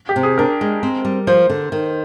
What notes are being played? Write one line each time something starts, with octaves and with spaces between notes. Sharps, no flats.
G4
C3
G#4
D4 A#4
G#3
C4
G3
F3 C5
D3
D#3